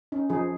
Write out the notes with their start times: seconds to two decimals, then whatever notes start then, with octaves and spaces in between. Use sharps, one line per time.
0.12 C#4 D#4
0.30 F3 D#4 G#4